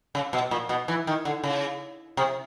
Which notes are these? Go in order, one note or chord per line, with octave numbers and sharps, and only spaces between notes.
C#3
B2
A#2
B2
E3
D#3
D3
C#3
C3